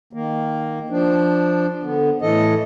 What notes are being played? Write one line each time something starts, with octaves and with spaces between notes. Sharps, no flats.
D#3 A#3
F3 D4
D3 B3
A2 E3 A4 D#5